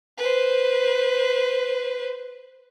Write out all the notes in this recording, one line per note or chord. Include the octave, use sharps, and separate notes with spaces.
B4 C5